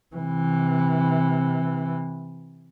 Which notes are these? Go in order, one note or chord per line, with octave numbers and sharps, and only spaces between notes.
C3 E3